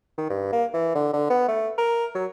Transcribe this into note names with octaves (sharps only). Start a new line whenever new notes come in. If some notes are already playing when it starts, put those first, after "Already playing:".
D#3
G2
A#3
E3
D3
D3
B3
A3
A#4
F#3